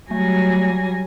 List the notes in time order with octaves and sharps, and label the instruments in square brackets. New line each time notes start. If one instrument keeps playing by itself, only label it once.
[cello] F#3 [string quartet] G3 G#5 A#6 [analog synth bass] A3